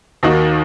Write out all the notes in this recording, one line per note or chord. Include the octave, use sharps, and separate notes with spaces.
D#2 D#3 A#3 D#4 F#4